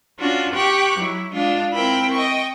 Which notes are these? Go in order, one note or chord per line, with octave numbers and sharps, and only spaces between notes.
C#4 D4 F4 F#4
G4 G5 C#6 D6 F#6
F#3 E4
G#3 D4 F4
C4 E4 A#4 G5 B5
D#5 G5 C#6